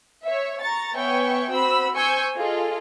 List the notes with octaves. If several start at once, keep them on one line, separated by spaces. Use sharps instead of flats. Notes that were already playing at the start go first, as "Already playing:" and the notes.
C#5 E5
A#5 C#6 A6
B3 C#5 E5 G5 G#5 C#6
C4 F#4 C5 B5 E6
C5 G#5 C#6 E6 G6
F4 G#4 A4 D#5